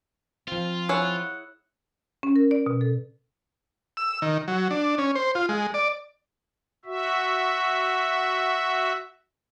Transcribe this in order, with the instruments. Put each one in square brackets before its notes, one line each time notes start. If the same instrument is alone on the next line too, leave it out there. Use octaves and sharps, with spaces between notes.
[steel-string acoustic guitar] F3 C4 [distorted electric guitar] F4
[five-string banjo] E4 G#4 C#5 [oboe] F#5
[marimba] C#4
A#4
D5
B2
A4
[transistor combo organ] E6
D#3
F#3
D4
C#4
C5
F4
G#3
D5
[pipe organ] F#4 E5